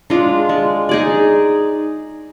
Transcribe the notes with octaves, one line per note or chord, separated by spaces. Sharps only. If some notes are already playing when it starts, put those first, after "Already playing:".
G#3 D4 F4
G#3
D#4 G#4 D5